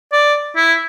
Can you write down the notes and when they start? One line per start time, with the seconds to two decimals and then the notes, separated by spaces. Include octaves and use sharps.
0.12 D5
0.56 E4